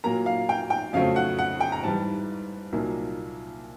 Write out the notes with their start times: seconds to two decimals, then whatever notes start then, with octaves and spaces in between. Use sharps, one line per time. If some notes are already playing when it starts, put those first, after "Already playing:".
0.04 A#2 F#3 A#3 A#5
0.26 F5
0.49 G5
0.70 G5
0.93 F2 C#3 F#3 A3 C4 F5
1.16 F#5
1.39 F#5
1.61 G5
1.72 A#5
1.83 G#2 E3 G3 A5
2.72 C2 A#2 F#3 A#3 D#4